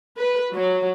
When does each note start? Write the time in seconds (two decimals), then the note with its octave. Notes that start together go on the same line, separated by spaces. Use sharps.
0.18 B4
0.54 F#3